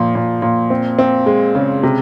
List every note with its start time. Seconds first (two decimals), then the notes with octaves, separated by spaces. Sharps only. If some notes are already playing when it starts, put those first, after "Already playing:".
Already playing: A#2 F3
0.15 A#2
0.42 A#2
0.70 C4
0.99 C4
1.26 G#3
1.55 C#3
1.83 C3